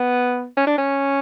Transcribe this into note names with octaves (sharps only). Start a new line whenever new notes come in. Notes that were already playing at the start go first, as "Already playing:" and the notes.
Already playing: B3
C#4
D4
C#4